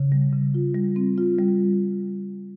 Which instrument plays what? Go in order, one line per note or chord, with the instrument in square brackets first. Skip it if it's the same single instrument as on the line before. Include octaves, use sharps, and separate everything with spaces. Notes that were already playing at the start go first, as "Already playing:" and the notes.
Already playing: [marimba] C#3
G3
C#3
F4
G3
C4
F4
G3